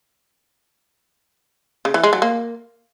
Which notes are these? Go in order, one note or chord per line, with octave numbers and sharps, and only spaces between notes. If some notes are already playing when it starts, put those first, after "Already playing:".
C#3
E3
G#3
F#3
A#3